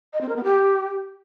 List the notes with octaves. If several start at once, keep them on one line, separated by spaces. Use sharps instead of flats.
D#5
C4
A#4
B3
G4